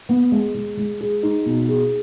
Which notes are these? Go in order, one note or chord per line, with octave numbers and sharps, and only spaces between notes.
B3
G#3
G#3
G#3
G#4
D#4
B2
G#4